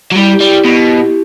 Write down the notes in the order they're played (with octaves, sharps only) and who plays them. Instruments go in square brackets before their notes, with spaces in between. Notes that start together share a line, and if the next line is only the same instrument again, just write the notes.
[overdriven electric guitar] F#3
[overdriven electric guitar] G3 [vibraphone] E4
[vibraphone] G4
[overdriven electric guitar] G3
[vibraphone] E4
[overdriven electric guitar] B2